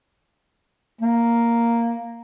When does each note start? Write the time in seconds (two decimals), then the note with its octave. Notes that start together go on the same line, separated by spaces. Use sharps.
1.01 A#3